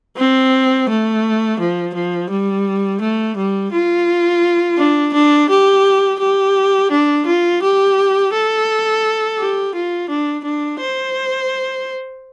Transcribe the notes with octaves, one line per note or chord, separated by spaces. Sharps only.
C4
A3
F3
F3
G3
A3
G3
F4
D4
D4
G4
G4
D4
F4
G4
A4
G4
F4
D4
D4
C5